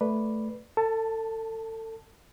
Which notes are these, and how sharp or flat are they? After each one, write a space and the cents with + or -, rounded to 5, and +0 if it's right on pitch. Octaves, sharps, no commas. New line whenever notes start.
A3 -5 B4 +0 D5 +0
A4 +30 A5 +0